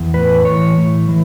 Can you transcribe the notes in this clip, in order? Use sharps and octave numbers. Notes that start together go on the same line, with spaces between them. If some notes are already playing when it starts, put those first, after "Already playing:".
Already playing: E2
A2 B4
E3 C#5
A2
E3